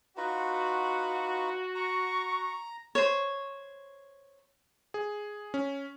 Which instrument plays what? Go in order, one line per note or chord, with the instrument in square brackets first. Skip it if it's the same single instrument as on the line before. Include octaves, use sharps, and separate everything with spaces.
[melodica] D#4 F4 B4 [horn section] F#4
[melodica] A#5 [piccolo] C#6
[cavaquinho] C5 C#5
[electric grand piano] G#4
C#4